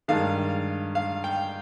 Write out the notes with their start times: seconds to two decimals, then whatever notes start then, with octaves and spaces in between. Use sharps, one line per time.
0.08 G2 D#3 G#3 F5
0.95 F5
1.24 G5